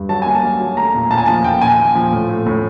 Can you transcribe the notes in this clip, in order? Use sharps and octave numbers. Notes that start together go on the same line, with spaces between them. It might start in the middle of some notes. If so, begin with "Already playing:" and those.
Already playing: G2
F#3 A5
A#3 G#5
A5
F#3
F#3
A3 A#5
A#2
A#2 A5
G#5
F3 A5
A#2 G5
A#2 G#5
A#2
F3
A2
A2
A2